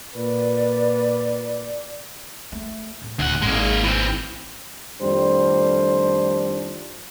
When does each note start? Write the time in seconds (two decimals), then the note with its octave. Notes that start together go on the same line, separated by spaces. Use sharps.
0.16 A#2 B4 D5
2.52 A3
3.02 A2
3.19 D1 D2 F#5
3.42 G#1 G#3 A#3
3.84 E3 C4
5.02 F2 A2 D#3 G3 D4 C5